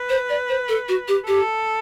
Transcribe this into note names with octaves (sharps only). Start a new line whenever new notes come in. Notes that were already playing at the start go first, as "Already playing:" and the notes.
Already playing: B4
C5
D5
C5
A4
F#4
G4
G4 A4